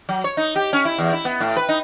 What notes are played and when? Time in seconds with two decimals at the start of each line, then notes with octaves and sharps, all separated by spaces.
0.09 F#3
0.24 C#5
0.37 D#4
0.56 G4
0.73 C#4
0.85 E4
0.98 E2
1.13 E4
1.25 B3
1.40 A2
1.56 B4
1.69 D#4